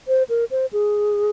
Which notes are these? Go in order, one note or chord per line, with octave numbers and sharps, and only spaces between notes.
C5
A#4
C5
G#4